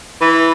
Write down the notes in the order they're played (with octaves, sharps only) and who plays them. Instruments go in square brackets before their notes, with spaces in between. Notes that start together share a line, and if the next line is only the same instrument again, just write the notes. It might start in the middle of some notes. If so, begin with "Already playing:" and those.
[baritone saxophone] E3